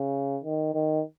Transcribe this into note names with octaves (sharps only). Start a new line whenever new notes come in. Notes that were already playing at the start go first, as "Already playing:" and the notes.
Already playing: C#3
D#3
D#3